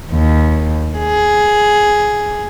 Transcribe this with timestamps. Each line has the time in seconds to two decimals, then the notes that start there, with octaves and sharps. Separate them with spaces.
0.11 D#2
0.99 G#4